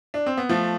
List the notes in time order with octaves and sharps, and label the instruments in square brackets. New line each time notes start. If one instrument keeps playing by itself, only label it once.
[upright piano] D4
C4
B3
F3 A3